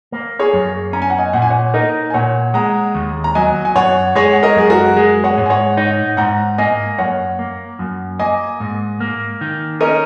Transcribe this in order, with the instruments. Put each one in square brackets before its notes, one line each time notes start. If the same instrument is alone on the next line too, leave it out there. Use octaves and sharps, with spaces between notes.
[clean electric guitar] A#3
[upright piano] G#4 C#5
[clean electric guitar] F#2
[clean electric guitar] C#4 [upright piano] A#5
[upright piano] G#5
F#5
D#5 G#5
[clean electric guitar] A#2 [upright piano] F#5
[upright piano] G#5
C#5 F#5
[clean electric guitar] D#4 [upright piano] A#4 D#5
[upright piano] G#5
[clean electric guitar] A#2 [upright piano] C#5 F#5
[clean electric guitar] G#3 [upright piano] F#5 A#5
[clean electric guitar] D#2
[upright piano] A#5
[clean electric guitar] F#3 [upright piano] D#5 G#5
[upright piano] G#5
[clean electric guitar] F#2 [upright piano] C#5 F#5
[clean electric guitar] G#3 [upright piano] G#4 C#5
[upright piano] F#5
A#4 D#5
[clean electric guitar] F#2 [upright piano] G#4
[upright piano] F#4 A#4
[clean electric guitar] G#3 [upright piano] G#4
[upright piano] C#5 F#5
[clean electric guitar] G#2
[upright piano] G#5
C#5 F#5
[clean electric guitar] D#4 [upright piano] C#5 F#5
[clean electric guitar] G#2 [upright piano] F#5 A#5
[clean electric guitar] A#3 [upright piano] D#5 G#5
[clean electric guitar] F#2 [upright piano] C#5 F#5
[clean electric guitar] A#3
F#2
[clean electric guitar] A#3 [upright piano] D#5 G#5
[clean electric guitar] G#2
A#3
D#3
[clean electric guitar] C#4 [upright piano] A#4 D#5